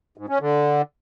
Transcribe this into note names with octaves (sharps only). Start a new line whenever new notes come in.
G#2
C#4
D3